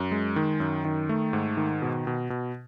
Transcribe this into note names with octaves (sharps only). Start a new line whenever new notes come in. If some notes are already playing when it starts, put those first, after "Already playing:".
Already playing: F#2
G#3
D#3
F#2
D#3
A3
G#2
D#3
B2
B2
B2